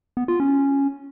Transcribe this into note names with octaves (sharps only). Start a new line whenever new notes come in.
B3
F4
C#4